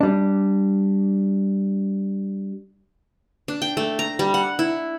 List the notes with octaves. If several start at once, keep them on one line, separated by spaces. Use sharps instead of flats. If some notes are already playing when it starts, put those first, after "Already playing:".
G3 D4
D4
G5
A3
A#5
G3
F#5
E4